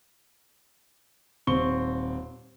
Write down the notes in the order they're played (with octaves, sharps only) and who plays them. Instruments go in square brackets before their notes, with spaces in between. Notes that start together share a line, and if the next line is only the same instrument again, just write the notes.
[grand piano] D#1 C4 C#6 G7